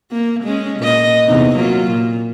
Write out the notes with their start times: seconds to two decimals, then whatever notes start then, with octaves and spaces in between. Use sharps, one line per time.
0.11 A#3
0.43 G#3 C#4
0.80 A#2 D#5
1.25 E2 C3 D#4
1.56 F#3 A#3 F4
1.91 A#2